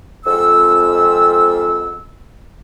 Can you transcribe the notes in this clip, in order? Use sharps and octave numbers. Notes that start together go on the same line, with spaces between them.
F2 G#2 E6